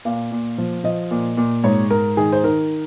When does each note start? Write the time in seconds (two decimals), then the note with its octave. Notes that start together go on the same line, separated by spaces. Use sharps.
0.05 A#2 F5
0.31 A#2
0.58 F3
0.84 F3 D#5
1.11 A#2
1.37 A#2
1.64 G#2 C#5
1.90 G#2 A#4
2.17 D#3 G#4
2.33 C5
2.44 D#3 A#4